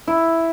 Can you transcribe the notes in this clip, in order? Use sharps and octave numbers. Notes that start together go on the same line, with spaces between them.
E4